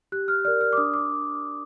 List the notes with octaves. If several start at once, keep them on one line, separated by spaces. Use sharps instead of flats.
G4 F#6
F6
A#4 D5 F6
F6
D6
D4 D#6
D6